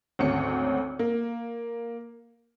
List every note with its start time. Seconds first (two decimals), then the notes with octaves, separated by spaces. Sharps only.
0.19 G#1 D2 C#4 C#7
0.99 A#3